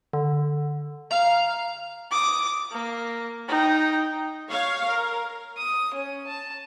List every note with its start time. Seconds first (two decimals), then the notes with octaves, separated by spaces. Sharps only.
0.13 D3
1.11 F5 A#5
2.11 D6 D#6
2.72 A#3
3.48 D#4 G5
4.50 C#5 F5
4.86 A#4
5.58 D#6
5.94 C#4
6.27 A5